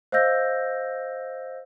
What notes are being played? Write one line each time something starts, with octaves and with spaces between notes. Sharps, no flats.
C5 D#5 F5 E6 G6 A#6